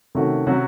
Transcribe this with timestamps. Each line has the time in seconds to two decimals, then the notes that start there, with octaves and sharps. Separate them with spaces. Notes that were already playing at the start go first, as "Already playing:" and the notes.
0.15 C3 D#3 A3 C#4 F#4
0.47 C3 F#3 C#4 F#4